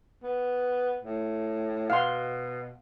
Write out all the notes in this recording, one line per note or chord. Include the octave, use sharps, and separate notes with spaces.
B3
A2
B2 F5 F#5 C6